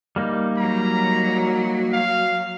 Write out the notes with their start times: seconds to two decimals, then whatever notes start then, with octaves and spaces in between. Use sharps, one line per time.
0.16 G3 A#3 D#4
0.58 F#3 A#5
1.92 F5